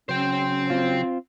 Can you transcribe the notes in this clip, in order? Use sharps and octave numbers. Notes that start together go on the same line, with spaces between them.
C#3 F#3 C#4 C5 G5
C4 F4